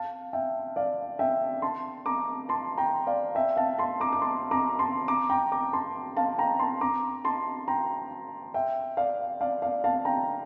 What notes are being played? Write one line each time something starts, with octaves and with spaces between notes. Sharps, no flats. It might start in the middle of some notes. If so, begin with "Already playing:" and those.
Already playing: F5 A5
E5 G5
D5 F5
E5 G5
A5 C6
A#5 D6
A5 C6
G5 A#5
D5 F5
E5 G5
F5 A5
A5 C6
A#5 D6
D6
A5 C6
A#5 D6
A5 C6
A#5 D6
G5 A#5
A#5 D6
A5 C6
F5 A5
G5 A#5
A5 C6
A#5 D6
A5 C6
G5 A#5
E5 G5
D5 F5
D5 F5
D5 F5
F5 A5
G5 A#5